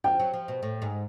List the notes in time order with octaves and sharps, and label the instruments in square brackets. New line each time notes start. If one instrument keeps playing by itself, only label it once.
[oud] F3 [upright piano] G5
[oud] F#3
F3
B2
A2
G#2